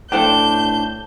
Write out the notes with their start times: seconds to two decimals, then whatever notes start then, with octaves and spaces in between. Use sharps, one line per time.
0.12 A2 D4 A4 C5 G5 G6